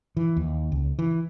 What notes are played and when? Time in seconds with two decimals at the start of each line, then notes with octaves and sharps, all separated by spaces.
0.17 E3
0.36 D#2
0.72 C#2
0.99 E3